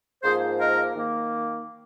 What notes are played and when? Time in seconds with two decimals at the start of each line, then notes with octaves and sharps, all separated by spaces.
0.23 G#2 F3 A#3 G#4 C5
0.59 A#4 D#5
0.95 D#3 A#3